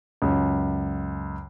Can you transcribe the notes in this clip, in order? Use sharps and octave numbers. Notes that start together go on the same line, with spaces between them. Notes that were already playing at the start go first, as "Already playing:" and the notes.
C#2 F#2